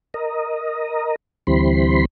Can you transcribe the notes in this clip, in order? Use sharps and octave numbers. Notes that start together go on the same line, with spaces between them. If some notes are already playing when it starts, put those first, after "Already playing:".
A#4 D#5
D2 E3 G3 C4 B5 C6